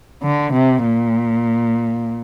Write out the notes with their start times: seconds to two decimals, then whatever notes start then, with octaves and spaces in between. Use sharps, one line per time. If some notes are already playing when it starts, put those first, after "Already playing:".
0.23 D3
0.53 C3
0.84 A#2